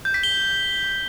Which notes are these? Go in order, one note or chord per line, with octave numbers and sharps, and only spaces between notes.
G6
B6
G7